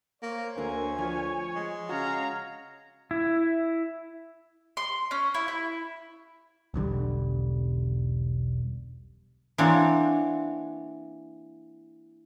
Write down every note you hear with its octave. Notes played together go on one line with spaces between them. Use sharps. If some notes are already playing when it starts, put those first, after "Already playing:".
A#3 C5 C#5
D2 D3 A#3 A#4 G#5
F3 C#5
G#3
C#3 F#4 C#5 F5 A#5
E4
C6
C#4
E4
E4
E1 B1 D3 G3
E3 A#3 C4 D4 F#4 C#5